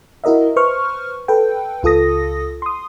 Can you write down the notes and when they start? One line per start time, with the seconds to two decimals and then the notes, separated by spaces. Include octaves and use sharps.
0.24 E4 F#4 A#4 D#5 E5
0.56 B4 C5 C#6 F6
1.28 A4 B4 G5
1.83 C#2 F4 A4 D#6 A#6
2.62 C6 D#6